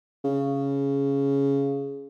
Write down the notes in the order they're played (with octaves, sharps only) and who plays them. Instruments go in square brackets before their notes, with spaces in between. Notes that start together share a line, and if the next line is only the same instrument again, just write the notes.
[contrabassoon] C#3